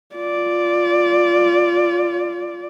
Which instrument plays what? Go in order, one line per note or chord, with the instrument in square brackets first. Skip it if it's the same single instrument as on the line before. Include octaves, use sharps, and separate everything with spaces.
[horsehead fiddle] F4 D5